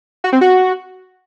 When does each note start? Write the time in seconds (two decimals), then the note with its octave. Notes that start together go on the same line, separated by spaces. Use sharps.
0.24 F#4
0.33 C4
0.41 F#4